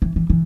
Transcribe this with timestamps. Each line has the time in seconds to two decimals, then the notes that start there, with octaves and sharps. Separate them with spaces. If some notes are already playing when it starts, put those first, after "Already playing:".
0.02 E3
0.16 E3
0.30 E3